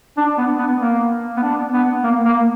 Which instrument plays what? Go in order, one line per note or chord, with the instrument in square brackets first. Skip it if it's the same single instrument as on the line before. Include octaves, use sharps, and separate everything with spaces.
[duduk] D4
B3
B3
A#3
B3
D4
B3
A#3
A#3